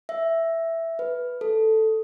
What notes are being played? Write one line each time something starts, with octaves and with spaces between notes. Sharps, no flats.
E5
B4
A4